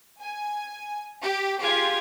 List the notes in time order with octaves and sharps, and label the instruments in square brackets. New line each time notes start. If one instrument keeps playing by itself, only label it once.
[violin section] G#5
G4
[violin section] F4 G4 [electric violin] G#4 G#6